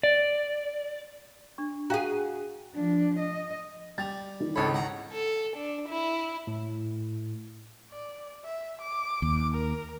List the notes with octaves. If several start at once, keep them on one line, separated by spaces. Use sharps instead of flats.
D5
D4 C#6
F#4 G#4 F5 G5 A#5
F3 D4
D#5
G3 A6 F7
D#3 E3
G#1 C#2 C#4 A4 C#5 B5
F#5 A#5
A4
D4
E4
A2
D5
E5
D6
D#2
A#4